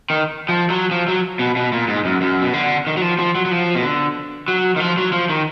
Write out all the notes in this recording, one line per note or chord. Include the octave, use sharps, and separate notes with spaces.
D#3
F3
F#3
F3
F#3
B2
B2
A#2
G#2
F#2
F#2
B2
D3
D#3
F#3
F3
F3
F#3
F#3
F3
B2
D3
F#3
D#3
F3
F#3
F3
D#3